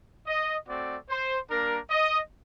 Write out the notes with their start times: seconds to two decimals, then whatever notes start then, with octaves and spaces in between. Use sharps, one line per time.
0.27 D#5
0.67 A3 C4 F#4 D5
1.08 C5
1.49 G3 A#3 D4 A#4
1.90 D#5